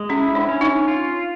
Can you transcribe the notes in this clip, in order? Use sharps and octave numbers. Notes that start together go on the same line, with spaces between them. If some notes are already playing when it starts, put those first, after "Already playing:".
Already playing: G#3
C#4 E4
D4
C#4
D#4
F4